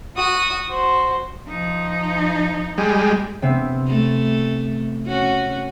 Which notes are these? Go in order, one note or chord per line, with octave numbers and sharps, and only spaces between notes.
F#4 D#6
F#4 C5
F3 D#4
G3 G#3
C3 B3 C4
A3
C#4 F#4